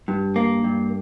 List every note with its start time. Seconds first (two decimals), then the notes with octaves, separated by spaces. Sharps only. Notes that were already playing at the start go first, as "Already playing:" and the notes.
0.08 G2
0.36 A#3
0.64 G2